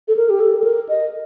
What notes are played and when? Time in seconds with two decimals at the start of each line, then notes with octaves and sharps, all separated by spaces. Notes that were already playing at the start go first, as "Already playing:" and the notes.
0.08 A4
0.17 A#4
0.30 G4
0.40 A4
0.60 A4
0.64 A#4
0.89 D#5